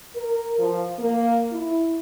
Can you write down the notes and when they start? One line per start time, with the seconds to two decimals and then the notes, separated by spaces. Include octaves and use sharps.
0.15 A#4
0.58 F3
0.98 A#3
1.51 E4